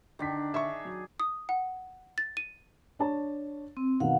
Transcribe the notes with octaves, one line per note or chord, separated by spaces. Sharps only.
D3 D#3 D4 B6
G#4 E5 C#6
F#3
D#6
F#5
A6
D#7
D4 C#5 A5
C4
B2 D#3 F5 F#5